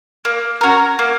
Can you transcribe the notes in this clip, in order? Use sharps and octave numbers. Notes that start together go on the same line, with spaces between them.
A#3
C#4 F#4 A#4
A#3